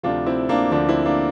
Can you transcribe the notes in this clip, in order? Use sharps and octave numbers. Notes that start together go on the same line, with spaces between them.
D2 C3 F3 D4 F4
C4 E4
A#3 D4
D2 D3 F3 A#3 D4
C4 E4
A#3 D4